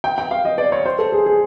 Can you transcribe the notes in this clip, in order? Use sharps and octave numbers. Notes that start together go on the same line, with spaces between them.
G5
G5
F5
D#5
D5
C#5
C5
A4
G#4
G#4